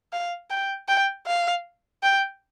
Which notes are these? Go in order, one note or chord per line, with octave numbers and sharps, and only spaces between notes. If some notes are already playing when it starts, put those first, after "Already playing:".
F5
G5
G5
F5
G5